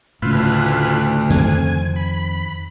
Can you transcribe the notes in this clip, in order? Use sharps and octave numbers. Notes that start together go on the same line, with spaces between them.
D2 A2 C#3 E4 F4 B4
F2 D#3 C4 G#5
B5